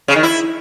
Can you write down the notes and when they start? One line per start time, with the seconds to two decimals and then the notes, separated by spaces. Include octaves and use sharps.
0.08 C#3
0.16 D#3
0.23 E4